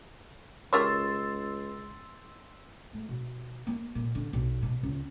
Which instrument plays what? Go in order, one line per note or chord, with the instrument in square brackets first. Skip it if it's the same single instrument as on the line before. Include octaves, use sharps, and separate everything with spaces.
[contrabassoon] C#2 [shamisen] G4 A#4 C#5 [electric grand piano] C6 E6 A6
[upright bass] A3
B2
A#3
A#2
D3
B1
B2
C#2